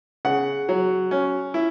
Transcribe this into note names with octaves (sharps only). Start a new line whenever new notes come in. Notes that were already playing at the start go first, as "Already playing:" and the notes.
C#3 F#5
F#3
C#4
E4